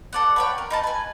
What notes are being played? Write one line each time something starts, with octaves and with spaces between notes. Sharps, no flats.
A4 D5 F#5
B4 C#5 G5
A#4
D#4 B4 A5
B4 G#5